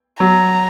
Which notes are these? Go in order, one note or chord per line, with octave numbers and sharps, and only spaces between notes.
F#3 A#5